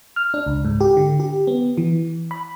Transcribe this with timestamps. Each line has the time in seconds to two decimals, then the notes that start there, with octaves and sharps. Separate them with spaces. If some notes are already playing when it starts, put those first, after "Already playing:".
0.16 F6
0.34 D4
0.46 C#2
0.65 G#2
0.81 G4
0.97 D3
1.20 G4
1.47 B3
1.77 E3
2.31 B5